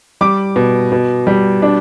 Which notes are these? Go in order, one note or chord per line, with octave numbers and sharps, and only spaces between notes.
G3 D6
B2
B2
G3
D4